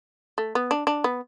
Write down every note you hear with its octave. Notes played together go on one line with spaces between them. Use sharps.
A3
B3
D4
D4
B3